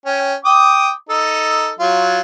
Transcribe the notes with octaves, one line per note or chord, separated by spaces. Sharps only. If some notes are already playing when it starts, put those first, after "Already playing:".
C#4 G5
G5 D6 D#6
D#4 A4
F#3 F4